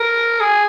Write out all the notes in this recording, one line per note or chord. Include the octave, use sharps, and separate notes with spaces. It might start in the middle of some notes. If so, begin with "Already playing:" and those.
Already playing: A#4
G#4